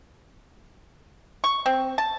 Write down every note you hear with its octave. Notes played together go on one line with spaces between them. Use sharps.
C#6
C4
A5